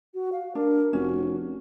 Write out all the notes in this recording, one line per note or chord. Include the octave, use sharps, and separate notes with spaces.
F#4
F5
D4 A#4
F1 C#4 F#4